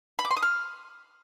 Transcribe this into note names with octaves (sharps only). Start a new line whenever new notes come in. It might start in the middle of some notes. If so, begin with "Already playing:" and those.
B5
D6
C6
D#6
F6